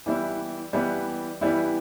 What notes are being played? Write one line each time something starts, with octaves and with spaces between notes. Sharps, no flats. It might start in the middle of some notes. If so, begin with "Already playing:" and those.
E3 G3 B3 E4
E3 G3 B3 E4
E3 G3 B3 E4